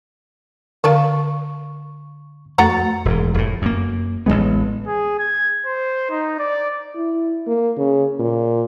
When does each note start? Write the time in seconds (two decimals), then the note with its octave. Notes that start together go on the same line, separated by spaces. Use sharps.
0.84 D3 A#4 D5 F5 A5 C#6
2.58 F2 A3 F#4 F#5 A#5 A6
3.05 E1 G#2
3.34 F1 A2
3.62 F#2 A#3
4.26 A1 C#3 G#3 B3
4.87 G#4
5.19 G#6
5.66 C5
6.10 D#4
6.39 D5
6.96 E4
7.47 A#3
7.78 C#3
8.19 A#2